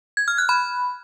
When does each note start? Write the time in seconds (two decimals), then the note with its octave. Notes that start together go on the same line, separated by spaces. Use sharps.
0.17 G#6
0.28 F6
0.38 F#6
0.49 B5